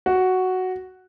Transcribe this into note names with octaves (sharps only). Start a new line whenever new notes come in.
F#4